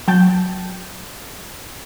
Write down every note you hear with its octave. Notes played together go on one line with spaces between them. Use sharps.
F#3 G5 A5 G6